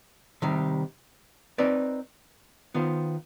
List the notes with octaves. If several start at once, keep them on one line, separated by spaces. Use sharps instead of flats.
C3 D#3 G3
C4 D#4 B4 D5
D#3 B3 F4 C5